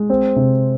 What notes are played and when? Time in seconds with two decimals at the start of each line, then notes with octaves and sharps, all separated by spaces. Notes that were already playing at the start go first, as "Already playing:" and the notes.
Already playing: G#3
0.10 C4
0.36 C3